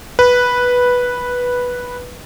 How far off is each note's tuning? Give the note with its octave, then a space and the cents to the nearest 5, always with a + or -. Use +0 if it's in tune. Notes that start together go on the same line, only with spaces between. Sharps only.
B4 -5